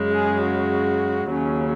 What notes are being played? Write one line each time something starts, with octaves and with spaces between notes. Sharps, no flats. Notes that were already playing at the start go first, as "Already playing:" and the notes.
Already playing: F#2 C#3 G#3
G#4
F#4
D#2 C#3 F#3 C#4